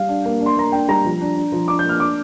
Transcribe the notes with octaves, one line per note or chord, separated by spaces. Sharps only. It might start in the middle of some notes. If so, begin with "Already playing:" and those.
Already playing: G3 F5
D4
A#3
D4
C6
A#3 A#5
D4 G5
G3 A#5
F3
D4
D4
F3
D4 D6
G6
A#3 F6
D4 D6